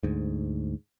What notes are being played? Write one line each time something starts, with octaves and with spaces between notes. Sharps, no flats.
D2 G#2